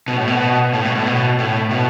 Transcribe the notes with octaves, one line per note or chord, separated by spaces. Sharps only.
B2
A2
B2
A2
B2
A2
B2
A2
B2